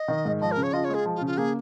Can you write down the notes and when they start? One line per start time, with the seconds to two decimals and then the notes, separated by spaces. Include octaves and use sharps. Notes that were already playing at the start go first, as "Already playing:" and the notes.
Already playing: D#5
0.08 D#3
0.25 G#2
0.41 F3 D#5
0.52 A#4
0.57 C#3
0.63 C#5
0.73 F4 D#5
0.85 C#5
0.90 G#3 G#4
1.06 F3
1.16 F4
1.21 C#3
1.26 F4
1.38 A#3 G#4